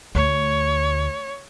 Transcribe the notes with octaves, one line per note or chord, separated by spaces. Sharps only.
D2 C#5